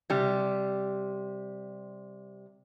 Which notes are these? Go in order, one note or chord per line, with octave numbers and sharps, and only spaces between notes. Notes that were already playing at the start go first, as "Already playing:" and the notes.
C3 G3